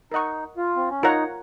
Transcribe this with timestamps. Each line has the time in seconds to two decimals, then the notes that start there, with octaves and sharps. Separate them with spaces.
0.12 D#4 A#4 D#5 F#5 C#6
0.57 F4
0.76 C4
0.90 C#4
1.03 D#4 F4 A#4 C#5 F#5 A#5